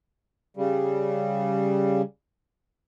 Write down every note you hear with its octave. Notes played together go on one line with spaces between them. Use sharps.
C#3 G3